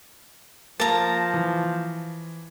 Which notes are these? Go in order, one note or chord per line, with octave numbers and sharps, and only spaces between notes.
F3 A#3 A5 A#5
E3